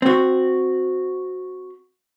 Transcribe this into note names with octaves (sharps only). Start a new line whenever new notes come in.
C4 F#4